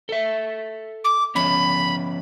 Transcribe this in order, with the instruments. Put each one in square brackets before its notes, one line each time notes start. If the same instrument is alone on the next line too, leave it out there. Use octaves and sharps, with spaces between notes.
[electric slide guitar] A4 E5
[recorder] D6
[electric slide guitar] F3 B3 C#4 [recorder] B5